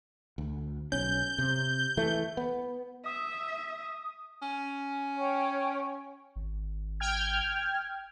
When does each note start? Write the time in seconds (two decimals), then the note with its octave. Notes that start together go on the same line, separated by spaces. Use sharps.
0.38 D2
0.92 B1 C#4 G6
1.38 C3
1.97 E3 A3
2.37 B3
3.06 E5 D#6
4.42 C#4
5.17 C#5 G5 C#6
6.36 G#1
7.00 G5 F6 G#6